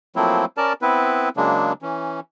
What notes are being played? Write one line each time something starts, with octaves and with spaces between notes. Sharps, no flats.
F3 F#3 A3 A#3 C4 E4
C#4 A#4 D5 A5
B3 C4 E4 B4
C#3 F#3 G#3 A#3 D4
E3 C#4